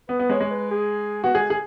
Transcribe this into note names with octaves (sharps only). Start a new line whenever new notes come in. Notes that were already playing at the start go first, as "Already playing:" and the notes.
B3 B4
B3
G#3 C#5
G#3
B4
G#4
B3 F#4
G#3 G#4
G#4